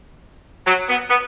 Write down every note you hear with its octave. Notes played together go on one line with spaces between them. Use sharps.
F#3
B3
B3